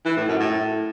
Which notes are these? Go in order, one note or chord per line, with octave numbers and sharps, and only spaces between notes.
E3
A2
F#2
A2